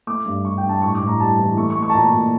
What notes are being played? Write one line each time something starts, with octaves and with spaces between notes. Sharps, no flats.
A3 D6
G2
G2 C#6
G5
G2
A5
A2 C#6
D6
A2
A#5
G3 A5
E3
A3 C#6
C#6
A3
C#6
A5
A#2 A#5
A#2